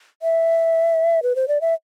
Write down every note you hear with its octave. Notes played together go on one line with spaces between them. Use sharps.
E5
B4
C5
D5
E5